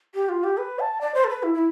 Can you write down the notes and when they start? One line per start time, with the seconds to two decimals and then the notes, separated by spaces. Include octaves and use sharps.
0.14 G4
0.29 F4
0.44 G4
0.57 B4
0.80 A5
1.01 D5
1.14 C5
1.24 A4
1.29 B4
1.43 E4
1.54 E4